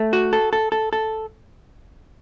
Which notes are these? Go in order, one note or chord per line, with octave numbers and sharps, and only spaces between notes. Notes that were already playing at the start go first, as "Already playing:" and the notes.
Already playing: A3
F#4
A4
A4
A4
A4